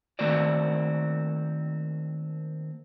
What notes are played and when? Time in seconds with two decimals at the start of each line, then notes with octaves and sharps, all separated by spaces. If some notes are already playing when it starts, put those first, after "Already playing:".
0.19 D#3 A3 A#3 C4 F#4 D5